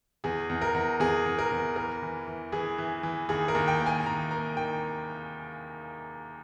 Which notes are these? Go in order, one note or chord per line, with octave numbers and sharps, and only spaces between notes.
E2 G#4
E2
A#4
E2
E2 G#4
E2
A#4
E2
E3 A#4
E3
E3
E3 G#4
E3
E3
D#2 G#4
A#4
D#2
G5
A#3
G#5
D#2 A#5
A#3 A#5
D#3 G5